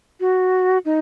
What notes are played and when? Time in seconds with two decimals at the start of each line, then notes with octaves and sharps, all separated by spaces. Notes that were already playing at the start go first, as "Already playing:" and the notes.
0.20 F#4
0.85 D#4